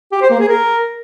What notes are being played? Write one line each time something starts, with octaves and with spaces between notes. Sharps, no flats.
G4
C5
A#3
G#4
A#4